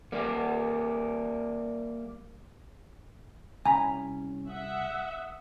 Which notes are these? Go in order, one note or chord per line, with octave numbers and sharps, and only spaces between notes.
G3 A#3
C2 C#4 G#5 A#5 B5
E5 F#5 D#6